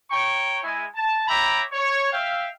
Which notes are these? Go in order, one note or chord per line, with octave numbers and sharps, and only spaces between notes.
C#5 G5 A#5 C#6
G#3 E4 G#5
A5
C#5 E5 G5 A#5 B5 D6
C#5
E5 F5 G5